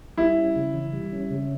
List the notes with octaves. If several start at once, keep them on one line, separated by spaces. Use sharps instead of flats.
G3 E4
C#4
C#3
E3
G3
C#4
C#3